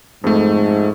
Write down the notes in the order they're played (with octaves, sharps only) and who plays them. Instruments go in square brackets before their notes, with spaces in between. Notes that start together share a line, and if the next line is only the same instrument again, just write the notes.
[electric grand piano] F2 A3 [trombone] G#2